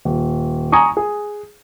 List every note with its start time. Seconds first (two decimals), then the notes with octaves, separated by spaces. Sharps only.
0.05 D#1
0.72 G#5 A#5 C#6 D#6
0.97 G#4